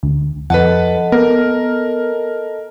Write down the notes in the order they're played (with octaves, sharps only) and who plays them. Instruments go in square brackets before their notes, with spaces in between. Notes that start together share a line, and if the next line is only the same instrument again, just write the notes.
[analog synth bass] D2
[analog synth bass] F2 [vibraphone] A4 D#5 A5 [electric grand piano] B4 F#5
[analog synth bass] B3 [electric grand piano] A#4